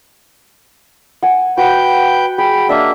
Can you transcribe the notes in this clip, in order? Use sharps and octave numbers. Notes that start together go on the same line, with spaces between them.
F#5 G#5
F#4 B4 G5 G6
G#4 G5 B5
A#3 D4 D#5 E5 E6